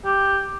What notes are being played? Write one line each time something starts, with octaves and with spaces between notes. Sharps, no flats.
G4